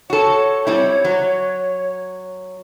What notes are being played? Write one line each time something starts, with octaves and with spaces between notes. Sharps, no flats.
F#4 A4 C#5
G3 C4 E4
F#3